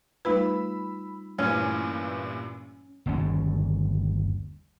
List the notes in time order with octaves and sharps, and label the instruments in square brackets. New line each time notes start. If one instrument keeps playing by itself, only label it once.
[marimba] G3 D#4 F4 [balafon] A3 B4 [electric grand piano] B5 E6
[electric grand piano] G2 A#2 E3 [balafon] A3 [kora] C#4
[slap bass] G1 D#2 D3 C#4